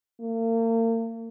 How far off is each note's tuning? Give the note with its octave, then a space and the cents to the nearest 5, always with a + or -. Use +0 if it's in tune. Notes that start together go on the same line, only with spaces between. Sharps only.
A#3 -40